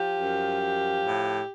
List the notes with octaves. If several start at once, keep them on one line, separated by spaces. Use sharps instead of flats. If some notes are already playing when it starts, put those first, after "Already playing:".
Already playing: F3 G4
F#2
F3
A2